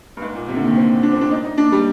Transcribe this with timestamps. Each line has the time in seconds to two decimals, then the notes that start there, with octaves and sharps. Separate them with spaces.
0.17 G2
0.22 G#2
0.35 A#2
0.49 C3
0.56 D3
0.62 D#3
0.77 C4
1.03 D4
1.12 C4
1.21 D4
1.31 D#4
1.45 D#4
1.58 D4
1.72 G3